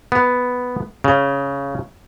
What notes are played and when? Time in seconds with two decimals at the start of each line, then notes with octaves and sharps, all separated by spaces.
0.12 B3
1.04 C#3